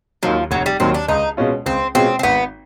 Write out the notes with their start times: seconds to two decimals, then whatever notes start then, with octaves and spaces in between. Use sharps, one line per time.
0.23 D#2 D#3 F3 F#3
0.51 F1 F#3
0.66 G3
0.80 D#2 D#3 F#3 C4
0.94 D4
1.08 C#2 D#4
1.37 B2 G#3 C#4 F4
1.66 C#2 C4
1.95 B2 G#3 C4 C#4 F4
2.19 C4
2.23 G#1 B3